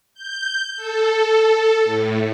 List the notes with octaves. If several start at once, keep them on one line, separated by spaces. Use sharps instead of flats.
G6
A4
A2